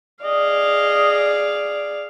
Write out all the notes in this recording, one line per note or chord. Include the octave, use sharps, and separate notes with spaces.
G#4 D5 D#5 F5